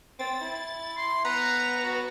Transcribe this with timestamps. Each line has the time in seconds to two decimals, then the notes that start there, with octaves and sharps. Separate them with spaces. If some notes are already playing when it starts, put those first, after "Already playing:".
0.19 C4 A6
0.41 E4
0.97 C6
1.25 B3 B4 A#5
1.84 F#4